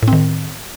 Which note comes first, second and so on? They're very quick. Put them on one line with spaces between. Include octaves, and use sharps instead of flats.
A2 C4 D#3